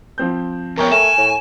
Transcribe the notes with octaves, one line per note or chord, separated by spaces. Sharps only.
F3 C4 G6
F2 B3 A#4 C#5 G5
A3 G#5 E7
A2